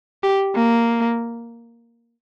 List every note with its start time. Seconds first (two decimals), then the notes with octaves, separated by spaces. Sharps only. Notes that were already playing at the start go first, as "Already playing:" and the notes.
0.23 G4
0.55 A#3